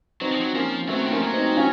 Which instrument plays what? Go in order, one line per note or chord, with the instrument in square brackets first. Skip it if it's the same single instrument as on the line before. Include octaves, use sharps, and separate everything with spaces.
[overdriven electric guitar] F#3 [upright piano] C4 D#4
[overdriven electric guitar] F3
F#3
[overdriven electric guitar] F3 [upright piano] A#3 C#4
[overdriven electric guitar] F#3 [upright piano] A3 C4
[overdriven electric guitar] D#3
[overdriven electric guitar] F3 [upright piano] A#3 C#4
[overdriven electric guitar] F#3
[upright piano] C4 D#4
C#4 F4